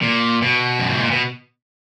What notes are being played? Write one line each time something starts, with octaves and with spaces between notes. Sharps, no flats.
A#2
B2
F#2
G#2
A#2
B2